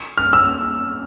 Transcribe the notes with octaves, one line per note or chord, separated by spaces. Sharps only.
F6
E6